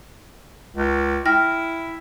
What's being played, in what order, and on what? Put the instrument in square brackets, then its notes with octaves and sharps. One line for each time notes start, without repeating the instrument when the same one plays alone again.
[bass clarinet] C#2
[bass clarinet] E4 [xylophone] G5 F6 A#6